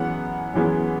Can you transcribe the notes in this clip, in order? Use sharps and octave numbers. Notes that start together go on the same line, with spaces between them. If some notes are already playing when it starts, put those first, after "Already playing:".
Already playing: F#2 E3 G#3 B3 F#5
F#2 E3 G#3 B3